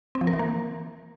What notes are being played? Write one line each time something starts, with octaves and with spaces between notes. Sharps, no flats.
C4
F3
A#4
E3
A#3